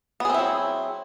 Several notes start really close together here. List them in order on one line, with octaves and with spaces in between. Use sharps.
B3 G#4 C4 E4 F#3